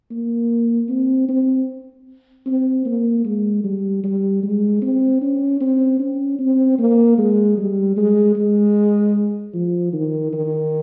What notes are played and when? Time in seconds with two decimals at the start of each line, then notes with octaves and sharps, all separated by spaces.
0.11 A#3
0.89 C4
1.29 C4
2.46 C4
2.86 A#3
3.25 G#3
3.64 G3
4.04 G3
4.43 G#3
4.82 C4
5.22 C#4
5.61 C4
6.00 C#4
6.39 C4
6.78 A#3
7.18 G#3
7.57 G3
7.96 G#3
8.36 G#3
9.54 F3
9.93 D#3
10.33 D#3